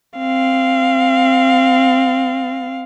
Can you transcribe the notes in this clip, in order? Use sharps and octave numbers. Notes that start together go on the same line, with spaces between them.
C4 F5